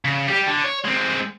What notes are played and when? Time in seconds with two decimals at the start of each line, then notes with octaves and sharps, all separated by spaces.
0.05 C#3
0.28 G3 G4
0.47 D3
0.64 C#5
0.85 G#3 C4